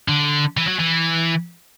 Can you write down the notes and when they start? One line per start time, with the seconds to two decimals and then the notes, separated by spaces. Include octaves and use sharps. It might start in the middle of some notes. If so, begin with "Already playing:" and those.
0.08 D3
0.57 E3
0.67 F#3
0.79 E3